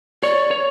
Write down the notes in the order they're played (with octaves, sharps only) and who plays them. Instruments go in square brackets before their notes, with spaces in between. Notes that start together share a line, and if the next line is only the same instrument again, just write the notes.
[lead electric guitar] C#5 [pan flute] D5
[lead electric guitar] C#5